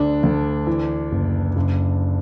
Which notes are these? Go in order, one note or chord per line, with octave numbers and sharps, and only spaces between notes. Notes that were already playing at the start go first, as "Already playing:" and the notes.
Already playing: D2 D4
D2
E3
F#1
F#1